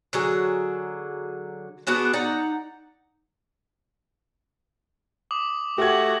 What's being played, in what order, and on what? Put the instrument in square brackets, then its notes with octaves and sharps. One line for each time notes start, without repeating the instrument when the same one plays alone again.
[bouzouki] D3 F#3 G#4
B3 D4 F#4 G#4
D#4 D5 F#5 A#5
[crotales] D6 D#6 F#7
[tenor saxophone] A3 [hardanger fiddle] F#4 [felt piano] G4 G#6